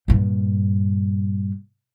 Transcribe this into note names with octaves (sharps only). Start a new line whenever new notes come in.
G2 A#2